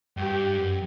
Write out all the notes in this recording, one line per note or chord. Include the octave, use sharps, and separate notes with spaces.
G2 G4
F#2